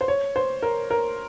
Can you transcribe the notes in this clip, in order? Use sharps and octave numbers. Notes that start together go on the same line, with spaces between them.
C5
C#5
C5
A#4
A#4